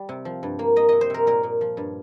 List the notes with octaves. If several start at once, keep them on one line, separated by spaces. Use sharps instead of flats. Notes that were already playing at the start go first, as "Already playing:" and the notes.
Already playing: G3
C3
F3
G2
A#3
A#3 D#5
C3 D#5
C5
C3 A#4
A#2 A#4
A#2
F3
G2